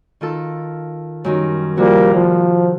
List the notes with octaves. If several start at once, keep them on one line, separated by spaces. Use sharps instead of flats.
D#3 F4 A4
F#2 D#3 G3
C3 F3 G3 A#3 F#4
F3